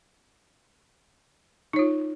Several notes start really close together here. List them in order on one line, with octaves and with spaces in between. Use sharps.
D#4 C#5 F4